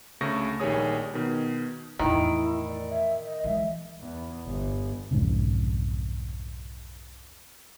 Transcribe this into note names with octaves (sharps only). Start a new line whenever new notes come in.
D2 C#3 A3 C#6 A#6
A#1 D#3 G3 G#4 C#5 D#6
B2 D#3
E2 A2 D#3 E4
D5
E5
D#5
E3 G#3 E5
E2
G1
B1 F2 G#2 C#3